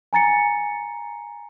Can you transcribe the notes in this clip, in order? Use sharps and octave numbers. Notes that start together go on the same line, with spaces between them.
G#5 A#5 A6 C#7